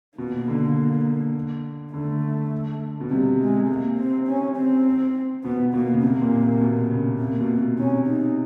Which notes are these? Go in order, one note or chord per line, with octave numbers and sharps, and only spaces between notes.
B2 A#3
D3
D3 A3
B2
C3 G3
G#3
A#3
C4
C#4
C4
B2 B3
B2 A#3
C#3
C3 A#3
A#2
A#2
B2
C#3
C3 A#3
B2
B2
C3 C#4
D#4